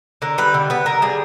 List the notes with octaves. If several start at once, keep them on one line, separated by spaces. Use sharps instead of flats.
D3 A#4
G3 B4
D3
B3 B4
D3 A#4
G3 G#4